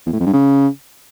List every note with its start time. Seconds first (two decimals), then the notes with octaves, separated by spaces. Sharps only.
0.06 E2
0.13 A2
0.20 F2
0.27 G2
0.33 C#3